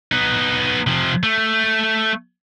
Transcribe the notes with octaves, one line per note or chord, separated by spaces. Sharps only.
B3 D#4
C3 F3
A3